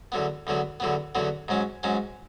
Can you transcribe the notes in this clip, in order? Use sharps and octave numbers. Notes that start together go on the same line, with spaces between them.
E2 D3 F#3 B3
E2 D3 F#3 B3
E2 D3 F#3 B3
E2 D3 F#3 B3
G#2 F#3 C#4
G#2 F#3 C#4